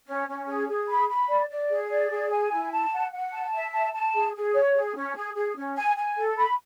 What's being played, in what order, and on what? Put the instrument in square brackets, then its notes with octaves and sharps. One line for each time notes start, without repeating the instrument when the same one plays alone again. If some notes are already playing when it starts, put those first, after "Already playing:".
[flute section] C#4
C#4
G#4
G#4
B5
B5
D5
D5
G#4
D5
G#4
G#5
E4
A5
F#5
F#5
A5
E5
A5
A5
G#4
G#4
C#5
G#4
C#4
G#4
G#4
C#4
G#5
G#5
A4
B5